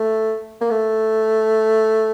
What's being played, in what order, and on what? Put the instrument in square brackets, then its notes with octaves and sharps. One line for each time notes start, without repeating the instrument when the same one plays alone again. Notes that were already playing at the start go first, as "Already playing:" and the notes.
Already playing: [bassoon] A3
A#3
A3